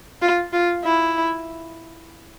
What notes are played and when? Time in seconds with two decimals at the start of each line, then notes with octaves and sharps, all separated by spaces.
0.22 F4
0.53 F4
0.84 E4